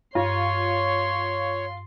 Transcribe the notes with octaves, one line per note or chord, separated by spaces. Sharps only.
G2 F4 C#5 C6